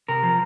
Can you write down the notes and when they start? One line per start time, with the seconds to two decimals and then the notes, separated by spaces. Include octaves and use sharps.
0.08 C3 A#4
0.23 F3